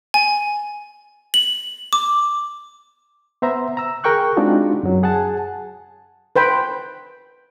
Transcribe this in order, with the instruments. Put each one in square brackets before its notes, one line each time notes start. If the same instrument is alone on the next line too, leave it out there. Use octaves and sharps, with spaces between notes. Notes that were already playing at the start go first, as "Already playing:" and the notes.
[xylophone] G#5
F#7
D6
[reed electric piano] B3 C5 E5 A#5
A#5 E6
G#4 A#4 G5 C#6 F#6
G#3 C4 D4 D#4 F4 F#4
F#2 F#3
G#4 F#5 G#5 A5
[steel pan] B4 C5 G5 B5